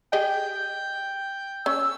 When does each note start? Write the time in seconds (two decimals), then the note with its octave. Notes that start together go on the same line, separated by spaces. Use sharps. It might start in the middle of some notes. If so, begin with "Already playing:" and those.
0.13 G4 G#4 D#5 G5
1.66 C#4 E6